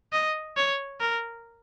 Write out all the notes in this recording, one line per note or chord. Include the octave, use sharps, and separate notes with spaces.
D#5
C#5
A#4